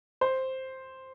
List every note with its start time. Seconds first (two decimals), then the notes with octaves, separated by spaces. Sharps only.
0.21 C5